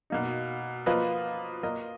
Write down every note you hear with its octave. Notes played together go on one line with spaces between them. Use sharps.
B2 A#3 D#4
F3 A#3 F4 B4 D#5
A#3 F4 A#4 D#5